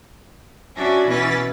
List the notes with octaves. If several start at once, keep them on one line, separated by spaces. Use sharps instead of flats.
C#4 D4 F#4 E5 G#5
B2 E3 C#4 B4 A6